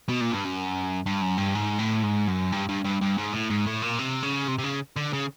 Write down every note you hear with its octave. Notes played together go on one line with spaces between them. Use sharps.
B2
A#2
G2
F#2
G2
F#2
G2
G#2
A2
G#2
F#2
G2
G2
G2
G2
G#2
A2
G#2
A2
A#2
C3
C#3
C3
C3
C#3
D3
C#3